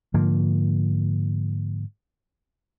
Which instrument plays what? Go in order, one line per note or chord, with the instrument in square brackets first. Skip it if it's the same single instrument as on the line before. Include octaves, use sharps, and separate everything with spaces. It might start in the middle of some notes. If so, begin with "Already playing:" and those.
[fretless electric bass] G#2 D3 F3 A#3